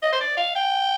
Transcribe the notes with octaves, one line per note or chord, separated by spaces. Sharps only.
D#5
C5
D5
F5
G5